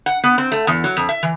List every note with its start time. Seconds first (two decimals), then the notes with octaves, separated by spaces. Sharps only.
0.06 F#5
0.24 B3
0.38 C4
0.52 A3
0.67 E2
0.84 F#3
0.97 F2
1.09 E5
1.23 E3